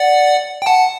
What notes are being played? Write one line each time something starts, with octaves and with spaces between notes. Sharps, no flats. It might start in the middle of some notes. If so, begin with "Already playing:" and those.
Already playing: D5 F#5
G5
F#5 A5